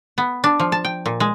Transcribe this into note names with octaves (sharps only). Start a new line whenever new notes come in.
B3
D4
F3
A5
G5
A#2
G#3